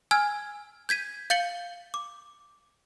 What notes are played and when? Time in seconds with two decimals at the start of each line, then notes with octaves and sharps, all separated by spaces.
0.11 G#5 E6 F6 G#6
0.89 G6 G#6 B6 D#7
1.30 F5 G6 A6 C#7 F#7 G7
1.94 D6